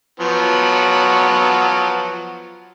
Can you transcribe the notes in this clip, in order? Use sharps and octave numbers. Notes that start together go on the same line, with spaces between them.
F3 F#3 B3